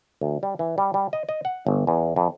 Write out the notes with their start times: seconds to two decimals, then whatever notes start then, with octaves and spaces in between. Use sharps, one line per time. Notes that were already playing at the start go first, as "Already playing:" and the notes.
0.21 D2
0.43 G3
0.59 E3
0.78 G3
0.94 G3
1.13 D#5
1.29 D#5
1.45 F#5
1.67 G1
1.87 E2
2.16 F2